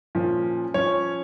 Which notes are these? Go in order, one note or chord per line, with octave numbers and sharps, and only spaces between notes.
A#2 F3 C#4
F3 C#4 C#5